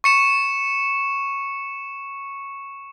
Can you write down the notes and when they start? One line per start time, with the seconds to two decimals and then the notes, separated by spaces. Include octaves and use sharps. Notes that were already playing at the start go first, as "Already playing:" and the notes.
0.04 C#6 C#7 E7